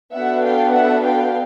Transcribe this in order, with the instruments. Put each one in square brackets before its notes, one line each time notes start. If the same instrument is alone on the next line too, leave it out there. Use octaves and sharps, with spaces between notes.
[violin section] B3 D4 F#4 A4 E5 F#5
F5 G5
E5 F#5
F5 G5